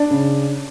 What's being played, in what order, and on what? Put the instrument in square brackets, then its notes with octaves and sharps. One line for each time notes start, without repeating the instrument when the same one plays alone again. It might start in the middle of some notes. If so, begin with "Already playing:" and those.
Already playing: [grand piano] D4 D5
C#3